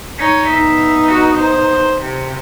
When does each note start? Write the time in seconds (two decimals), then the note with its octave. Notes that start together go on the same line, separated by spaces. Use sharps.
0.18 D#4 C#5
0.48 B3 D#4 E5
1.08 F#4
1.38 C5
2.02 C3